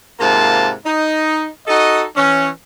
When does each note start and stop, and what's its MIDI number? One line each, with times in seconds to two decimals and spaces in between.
0.20 0.73 44
0.20 0.73 48
0.20 0.73 58
0.20 0.73 65
0.20 0.73 81
0.86 1.48 63
1.68 2.04 63
1.68 2.04 66
1.68 2.04 69
1.68 2.04 75
2.16 2.50 52
2.16 2.50 61